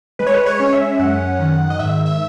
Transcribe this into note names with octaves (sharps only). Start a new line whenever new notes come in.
G#3 B4
C#5
B4
C#5
C#4
E5
F#2 F#5
D#3
D#5
G#2 E5
E5